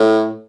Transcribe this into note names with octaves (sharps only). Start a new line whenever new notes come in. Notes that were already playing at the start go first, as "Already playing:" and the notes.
Already playing: A2